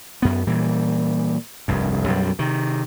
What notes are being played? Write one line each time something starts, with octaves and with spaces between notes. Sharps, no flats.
F#2 B3
A#2 E3 G3
F1 C2 G2
B1 F#2 D#3 G3
C3 D#3